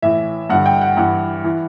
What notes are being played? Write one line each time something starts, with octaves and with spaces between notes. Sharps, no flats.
A2 E3 E5
G2 D3 F#5
G5
F#5
G2 E3 F#5
E3